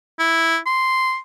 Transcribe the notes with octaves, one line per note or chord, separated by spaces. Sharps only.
E4
C6